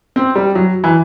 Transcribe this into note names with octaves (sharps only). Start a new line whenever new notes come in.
C4
G3
F#3
E3